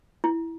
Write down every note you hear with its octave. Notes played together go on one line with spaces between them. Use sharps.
E4